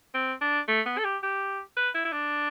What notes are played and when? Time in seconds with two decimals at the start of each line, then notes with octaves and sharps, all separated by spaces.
0.14 C4
0.41 D4
0.68 A3
0.86 B3
0.98 A4
1.04 G4
1.23 G4
1.77 B4
1.94 E4
2.05 E4
2.12 D4